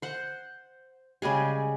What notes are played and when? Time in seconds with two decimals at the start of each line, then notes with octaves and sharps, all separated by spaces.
0.02 C5 F#5
1.22 C#3 G3 G#3 G#4